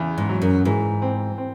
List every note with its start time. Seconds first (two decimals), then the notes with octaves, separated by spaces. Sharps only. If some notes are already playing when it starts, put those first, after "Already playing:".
Already playing: E2 C#3
0.18 G#2
0.29 F#3
0.42 F#2
0.65 G#2 E3
1.02 C4
1.38 C4